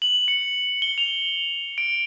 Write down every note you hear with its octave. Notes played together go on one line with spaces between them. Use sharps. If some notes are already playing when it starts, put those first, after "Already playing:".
F#7
C#7
G7
F7
D7